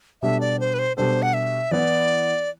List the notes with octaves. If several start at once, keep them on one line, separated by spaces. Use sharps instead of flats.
B2 G3 D4 A4 E5
D5
C5
B4
C5
B2 G3 D4 A4 C5
F#5
E5
E3 B3 E4 D5